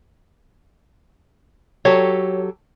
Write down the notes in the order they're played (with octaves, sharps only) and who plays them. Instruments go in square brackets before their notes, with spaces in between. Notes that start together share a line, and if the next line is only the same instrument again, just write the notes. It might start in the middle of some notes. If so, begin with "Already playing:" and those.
[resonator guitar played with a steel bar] F#3 G4 A4 [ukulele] C#5